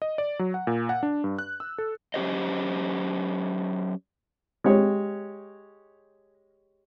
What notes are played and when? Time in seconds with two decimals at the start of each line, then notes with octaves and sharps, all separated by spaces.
0.02 D#5
0.18 D5
0.39 F#3
0.54 F#5
0.67 A#2
0.89 F#5
1.03 D4
1.24 G2
1.39 F#6
1.60 E6
1.78 A4
2.14 F#3 C#4 G4 C5 D#5
4.64 G#3 G4 C#5